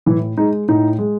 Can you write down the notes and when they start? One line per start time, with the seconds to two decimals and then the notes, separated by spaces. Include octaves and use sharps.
0.06 A2 E3 E4
0.37 G#3 D#4
0.69 A2 D#4
0.99 G#3